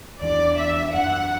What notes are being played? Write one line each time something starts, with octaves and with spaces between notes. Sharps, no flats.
E2 E3 B3 D4 D5
E5
F#2 F#3 A3 D4 F#5